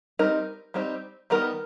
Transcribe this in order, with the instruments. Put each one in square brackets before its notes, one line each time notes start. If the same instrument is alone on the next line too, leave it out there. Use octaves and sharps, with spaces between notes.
[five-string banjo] G3 C4 D#4 A#4
G3 C4 D#4
D#3 G3 B3 A#4